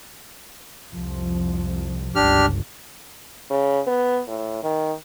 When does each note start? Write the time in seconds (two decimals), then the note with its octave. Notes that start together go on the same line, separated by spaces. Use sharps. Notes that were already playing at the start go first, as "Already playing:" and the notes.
0.90 C2 F2 F3
2.15 G1 C#2 D4 G4 F6
3.51 C#3
3.87 B3
4.28 A2
4.63 D#3